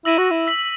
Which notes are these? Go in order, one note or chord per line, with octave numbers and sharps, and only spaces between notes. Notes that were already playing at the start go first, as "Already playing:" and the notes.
E4 E6 A#6 D#7
F#4
E4
E6 B6 F#7